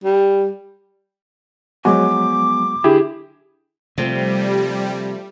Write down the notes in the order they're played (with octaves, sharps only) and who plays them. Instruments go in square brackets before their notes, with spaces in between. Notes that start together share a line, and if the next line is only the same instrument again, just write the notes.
[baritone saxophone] G3
[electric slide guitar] F3 B3 G#5 [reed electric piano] F#3 G#3 F#4 [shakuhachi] D6
[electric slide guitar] D3 [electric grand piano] E4 G4 G#4
[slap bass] C3 [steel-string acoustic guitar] F3 A3 C4 [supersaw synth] G3